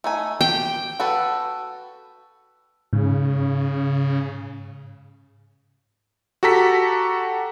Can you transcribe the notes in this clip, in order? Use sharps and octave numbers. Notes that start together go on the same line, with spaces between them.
A3 D#4 G#5
G4 G5
F#4 A4 B4
G#2 C#3
F#4 G4 A4 A#5 B6